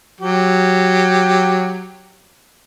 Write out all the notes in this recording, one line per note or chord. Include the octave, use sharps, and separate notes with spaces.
F#3 G4